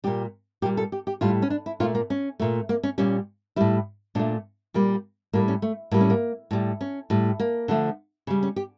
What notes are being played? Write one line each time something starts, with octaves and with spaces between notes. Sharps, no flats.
A#2 G3 G4
A#2 G3 G4
A4
G4
G4
A2 G3 F4
C#4
D4
E4
A#2 A3 F4
A#3
C#4
A#2 A3
A#3
C#4
A#2 G3 C#4
A2 G3 E4
A#2 A3 D4
A#2 G3 A#3
A2 G3 A#3
C#4
A3
A2 G3 A#3
C#4
A#3
A2 G3
C#4
A2 G3
A#3
D3 F3 A3
C#3 G3
C#4
G4